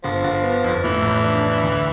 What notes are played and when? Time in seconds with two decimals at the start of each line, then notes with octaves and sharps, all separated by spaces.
0.03 G1 F3
0.24 G1
0.43 B3
0.64 F2
0.84 A2 E3
1.03 A1
1.23 D4
1.43 D4
1.63 D2